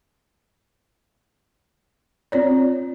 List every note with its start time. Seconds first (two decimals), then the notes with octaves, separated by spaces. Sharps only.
2.32 C4 F4 C#5 D5